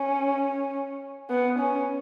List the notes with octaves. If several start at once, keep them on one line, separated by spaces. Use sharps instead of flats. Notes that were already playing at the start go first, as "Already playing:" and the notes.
Already playing: C#4
B3
C#4